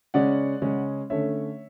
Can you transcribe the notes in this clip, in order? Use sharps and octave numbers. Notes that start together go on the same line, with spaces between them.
C#3 G#3 C#4 D5 F#5
C#3 G#3 C#4
D3 A3 C#4 C#5 E5